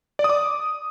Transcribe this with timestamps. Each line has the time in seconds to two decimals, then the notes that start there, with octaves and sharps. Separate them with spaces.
0.19 D5
0.24 D#6
0.30 D6